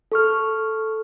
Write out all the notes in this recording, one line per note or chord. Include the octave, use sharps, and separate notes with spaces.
A4 C#6 F6